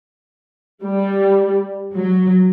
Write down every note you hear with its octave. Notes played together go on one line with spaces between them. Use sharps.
G3
F#3